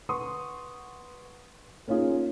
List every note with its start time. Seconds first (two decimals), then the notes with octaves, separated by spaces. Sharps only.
0.09 B4 F#5 C6 C#6 D#6
1.88 A#3 C#4 D#4 F4 G#4